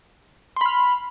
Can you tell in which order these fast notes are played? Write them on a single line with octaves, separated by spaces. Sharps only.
C6 B5 F6